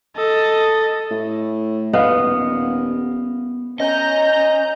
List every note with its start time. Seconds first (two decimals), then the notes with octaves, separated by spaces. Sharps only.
0.16 A4 D#5
1.11 A2
1.93 D#1 B3 D#5 F5
3.80 C#4 D#5 A#5 G6